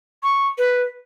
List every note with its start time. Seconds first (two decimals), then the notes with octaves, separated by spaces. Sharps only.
0.23 C#6
0.58 B4